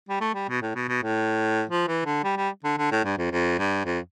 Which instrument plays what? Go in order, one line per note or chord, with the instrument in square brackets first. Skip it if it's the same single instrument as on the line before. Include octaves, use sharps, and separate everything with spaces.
[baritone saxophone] G3
A3
G3
B2
A2
B2
B2
A2
F3
E3
D3
G3
G3
D3
D3
A2
G2
F2
F2
G2
F2